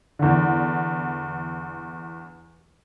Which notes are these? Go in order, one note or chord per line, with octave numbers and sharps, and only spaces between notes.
E2 D3